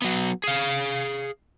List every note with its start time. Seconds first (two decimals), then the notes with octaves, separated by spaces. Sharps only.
0.02 F#3 B3
0.44 G#4 F5